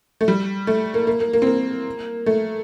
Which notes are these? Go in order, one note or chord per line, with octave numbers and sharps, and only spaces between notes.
A3
G3
A3
A#3
A#3
A#3
A#3
C4
A#3
A3